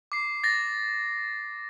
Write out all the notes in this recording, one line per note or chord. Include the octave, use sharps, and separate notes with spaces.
D6 C7
A6 A#6